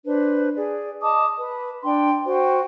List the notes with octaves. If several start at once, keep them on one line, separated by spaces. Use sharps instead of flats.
D4 B4 C5
G#4 D5
D#5 A5 D6 D#6
B4
D4 G5 C6
F#4 C5 G5